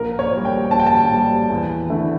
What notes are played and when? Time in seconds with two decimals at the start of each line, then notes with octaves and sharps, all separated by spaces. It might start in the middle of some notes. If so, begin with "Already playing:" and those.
Already playing: A#1 A#4
0.19 C#5
0.32 A#2 G3
0.45 G5
0.71 A#1 A5
0.79 G5
0.86 A5
1.11 A#2 G3
1.50 E2
1.90 D3 A3 E4